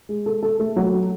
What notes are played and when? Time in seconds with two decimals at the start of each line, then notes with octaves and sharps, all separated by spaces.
0.09 G#3
0.26 A4
0.42 A4
0.60 A3
0.76 F#3